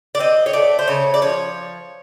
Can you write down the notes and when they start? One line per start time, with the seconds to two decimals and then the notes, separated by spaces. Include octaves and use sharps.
0.15 D5
0.19 C4 D#5
0.46 C#5
0.53 A3 D5
0.79 C5
0.88 C#3 C#5
1.14 D5
1.22 F3 C#5